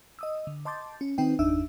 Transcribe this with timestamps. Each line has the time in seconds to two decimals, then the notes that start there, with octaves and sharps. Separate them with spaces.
0.19 D#5 D#6 E6
0.47 D3
0.65 D#5 A5 C6 D6 G6 A6
1.01 C#4
1.18 D#3 C4 D#4 B4 G5
1.39 G1 E2 D4 D#4 E5 E6